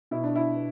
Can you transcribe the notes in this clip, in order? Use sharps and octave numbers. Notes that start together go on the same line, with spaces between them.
B2 E4
D4
E4
B3